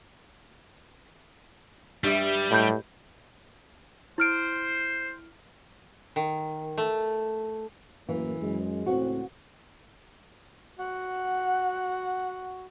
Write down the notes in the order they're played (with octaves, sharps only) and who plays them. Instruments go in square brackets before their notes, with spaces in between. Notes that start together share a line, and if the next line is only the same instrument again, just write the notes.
[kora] G2 E5 [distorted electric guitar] G3
[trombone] A2 [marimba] D#5 B5 G6
[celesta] E4 F6 D7 [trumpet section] C5
[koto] D#3
A3
[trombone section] F#2 A2 A#3 [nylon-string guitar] E3
[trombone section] F#2 G#3
[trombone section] C#2 A2 C4 [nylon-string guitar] F#4 F#5
[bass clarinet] F#4 [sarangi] F#5